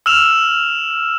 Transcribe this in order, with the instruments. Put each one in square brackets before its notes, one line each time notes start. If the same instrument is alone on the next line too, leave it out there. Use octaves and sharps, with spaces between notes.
[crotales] E6 F6 E7 F7